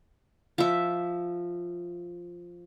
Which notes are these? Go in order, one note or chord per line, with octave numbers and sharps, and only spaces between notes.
F3 E5